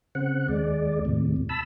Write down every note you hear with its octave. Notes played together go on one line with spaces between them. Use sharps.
C#3 C4 F#5
D#2 G#3 D5
D#2 A2 C3
A5 B5 E6